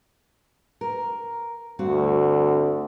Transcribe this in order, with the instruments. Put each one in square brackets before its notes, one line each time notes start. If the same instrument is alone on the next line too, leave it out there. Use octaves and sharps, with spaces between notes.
[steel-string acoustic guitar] A#4
[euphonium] D2 [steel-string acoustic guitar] G2 C4 F#4